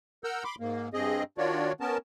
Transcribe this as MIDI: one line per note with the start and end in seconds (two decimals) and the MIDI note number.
0.24 0.44 70
0.24 0.44 78
0.24 0.44 88
0.24 0.44 89
0.24 0.44 91
0.44 0.55 83
0.44 0.55 84
0.44 0.55 86
0.60 0.88 44
0.60 0.88 58
0.94 1.23 43
0.94 1.23 60
0.94 1.23 68
0.94 1.23 75
1.38 1.72 51
1.38 1.72 62
1.38 1.72 65
1.38 1.72 66
1.38 1.72 73
1.38 1.72 74
1.80 1.98 59
1.80 1.98 61
1.80 1.98 70
1.80 1.98 81